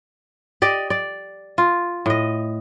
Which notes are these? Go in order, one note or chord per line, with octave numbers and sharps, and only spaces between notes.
G4 D5 D#5
D5
F4
A2 D#5